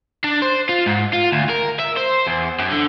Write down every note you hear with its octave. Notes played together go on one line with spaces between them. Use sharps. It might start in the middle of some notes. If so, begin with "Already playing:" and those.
D4
C5
F4
G#2
F4
D2
A#4
E5
C5
E2
F#2
D3